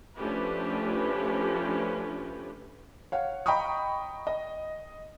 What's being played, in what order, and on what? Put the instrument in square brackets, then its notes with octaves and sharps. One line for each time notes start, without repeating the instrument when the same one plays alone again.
[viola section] F3 A3 C#4 D4 G4 B4
[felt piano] C#5 F5 F#5
D#5 G5 A#5 B5 C#6 D#6
D#5